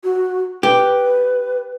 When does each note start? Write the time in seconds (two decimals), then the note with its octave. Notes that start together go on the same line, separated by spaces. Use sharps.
0.04 F#4
0.63 G4 B4